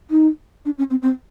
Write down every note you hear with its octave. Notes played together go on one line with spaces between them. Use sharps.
D#4
D4
C#4
C4
C4